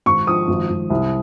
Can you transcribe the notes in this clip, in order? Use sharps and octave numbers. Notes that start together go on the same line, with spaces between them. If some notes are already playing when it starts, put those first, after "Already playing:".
G#1 C#6
F3 D#6
G#1
G#1
C2